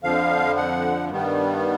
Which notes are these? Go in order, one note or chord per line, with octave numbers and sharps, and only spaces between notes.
F2 D3 F3 F5
F#5
G2 D#3 G3 B3